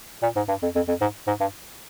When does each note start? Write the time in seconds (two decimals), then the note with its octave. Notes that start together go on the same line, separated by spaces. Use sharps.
0.22 A#2
0.36 G#2
0.48 G2
0.62 F2
0.75 F2
0.88 F2
1.01 G#2
1.27 G#2
1.40 G2